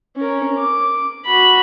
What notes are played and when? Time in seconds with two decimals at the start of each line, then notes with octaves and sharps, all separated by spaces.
0.17 C#4 A#4
0.57 D6
1.26 F#4 B5